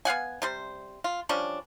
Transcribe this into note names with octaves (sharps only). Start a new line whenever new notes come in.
B3 F5 F#5 G#5
C3 G3 C5
F4
F3 G3 C#4 D4